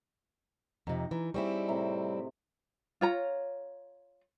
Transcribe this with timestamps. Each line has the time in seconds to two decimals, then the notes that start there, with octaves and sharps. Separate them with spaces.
0.87 F2 C3 D#4 A#5
1.11 E3
1.34 G3 C4 E4 G#4 C#5
1.68 A2 C3 A#5
3.01 F4 C#5 A#5